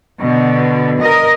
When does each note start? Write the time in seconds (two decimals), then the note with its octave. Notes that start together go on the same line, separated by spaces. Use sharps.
0.21 B2 D3
1.01 A#4 D#5